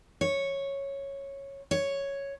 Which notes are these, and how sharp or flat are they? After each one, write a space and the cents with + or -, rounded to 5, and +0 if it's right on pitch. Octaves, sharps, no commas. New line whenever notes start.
C#5 -5
C#5 +0